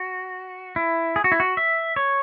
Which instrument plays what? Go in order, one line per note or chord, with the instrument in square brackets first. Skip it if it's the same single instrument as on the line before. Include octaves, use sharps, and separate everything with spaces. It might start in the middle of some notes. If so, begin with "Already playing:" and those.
Already playing: [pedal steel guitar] F#4
E4
G#4
F#4
E4
F#4
E5
C#5